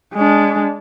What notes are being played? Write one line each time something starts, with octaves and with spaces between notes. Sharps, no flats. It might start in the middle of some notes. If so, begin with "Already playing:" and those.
G#3 D4